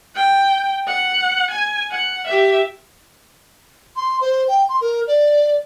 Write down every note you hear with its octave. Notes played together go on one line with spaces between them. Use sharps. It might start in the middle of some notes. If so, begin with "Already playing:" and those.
G5
F#5
G#5
F#5
G4 E5
C6
C5
G5
C6
A#4
D5